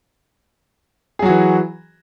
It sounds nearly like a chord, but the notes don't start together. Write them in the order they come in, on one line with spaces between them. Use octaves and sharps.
G#4 F#3 F#4 E3